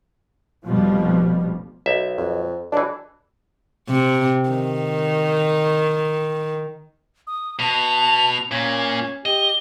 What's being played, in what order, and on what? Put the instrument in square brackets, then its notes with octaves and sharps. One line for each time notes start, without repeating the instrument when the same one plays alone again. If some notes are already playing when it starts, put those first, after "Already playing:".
[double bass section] F1 B2 F3 G3
[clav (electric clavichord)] B1 E5
[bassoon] F2
[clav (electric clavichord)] B1 E3 [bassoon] D4
[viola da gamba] C3
D#3
[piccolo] D#6
[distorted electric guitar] B2 [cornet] A5 [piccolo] F7
[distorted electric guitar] A#2 [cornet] C#4 [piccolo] G#6
[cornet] G4 [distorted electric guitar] D#5 [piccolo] G7